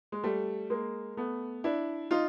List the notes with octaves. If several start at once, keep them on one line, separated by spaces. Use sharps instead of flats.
G#3
G3 A3
G#3 A#3
A3 B3
D4 E4
D#4 F4